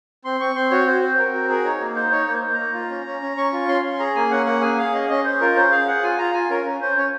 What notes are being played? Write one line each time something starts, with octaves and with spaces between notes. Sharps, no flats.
C4 C6
C4 C#6
C4 C6
F#4 C#5
F#4 C5
C4
C4 A#4
F#4
G#4 A#4
D#4 C#5
A#3
D#4 C5
D#4 C#5
A#3
C5
A#3
A#5
A#3
F4
C#4
C#4
C#4
C#4 C#6
F4
C#4 C6
C#4
G#4 A#5
A#3 G#5
C#4 F#5
A#3 F#5
G#4 G#5
G#4 F5
C#4 D#5
C#4 D#5
C#4 C5
F4 A#4
C#4 C5
G#4 F5
G#4 F#5
F4 G#5
F4 A#5
F4 G#5
C#4 A#4
C#4
C#4 C5
C#4 C#5